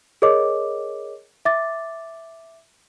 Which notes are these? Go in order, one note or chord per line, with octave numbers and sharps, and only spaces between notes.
G#4 A#4 C#5 D#5 D6
E5 D6 A6